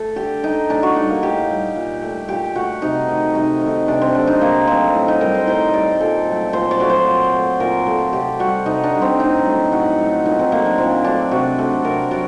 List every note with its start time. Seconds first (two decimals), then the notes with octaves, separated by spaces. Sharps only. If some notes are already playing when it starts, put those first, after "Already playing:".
Already playing: A3 A4
0.16 D3 G4
0.43 A3 D#4
0.69 A2 D4
0.83 F#4
0.96 G3 D#4
1.10 A#3
1.23 A2 G4
1.49 G3
1.75 A#2
2.02 A3
2.28 A#2 G4
2.55 A3 F#4
2.82 C3 D#4
3.08 D#3 A3
3.34 C3 D#4
3.62 D#3 A3
3.88 C3 D4
4.01 C4
4.15 F#3 A3 D4
4.27 D#4
4.41 C3 A#3
4.67 F#3 A3 C4
4.94 A2
5.08 D#4
5.21 G3 A#4
5.35 C5
5.47 A2 C5
5.73 G3 D5
6.00 A#2 A4
6.27 F#3 A3
6.53 A#2 C5
6.71 D5
6.80 F#3 A3
6.89 C5
7.07 A#2
7.33 A3
7.60 A#2 A#4
7.87 A3 A4
8.13 C3 G4
8.40 G3 F#4
8.66 C3 D#4
8.84 D4
8.93 G3
9.01 C4
9.19 A2 D#4
9.46 F#3 A3
9.72 A2 F#4
9.99 F#3 A3
10.25 A#2 D#4
10.39 C4
10.52 F#3 A3 A#3
10.66 D4
10.78 A#2 C4
11.04 F#3 A3 D4
11.31 C3 F#4
11.58 F#3 A3 A4
11.84 C3 A#4
12.11 F#3 D5